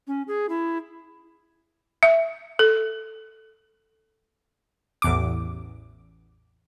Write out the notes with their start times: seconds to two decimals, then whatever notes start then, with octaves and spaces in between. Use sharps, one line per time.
0.07 C#4
0.28 G#4
0.49 E4
2.03 E5
2.59 A4
5.02 A1 E2 D6